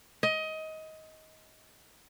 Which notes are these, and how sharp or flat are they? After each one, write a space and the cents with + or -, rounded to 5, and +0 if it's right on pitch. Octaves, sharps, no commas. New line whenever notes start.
D#5 +20